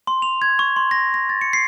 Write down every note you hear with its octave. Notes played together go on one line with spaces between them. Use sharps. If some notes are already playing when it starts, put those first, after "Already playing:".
C6
F7
G#6
C#6
C6
A#6
A#6
A6
C#7
C7